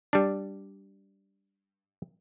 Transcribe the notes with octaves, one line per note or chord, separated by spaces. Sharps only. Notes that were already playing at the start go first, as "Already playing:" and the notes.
G3 D4